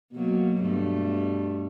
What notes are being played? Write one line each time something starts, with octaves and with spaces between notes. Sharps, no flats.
B2 F#3 A#3
G2 B2 A3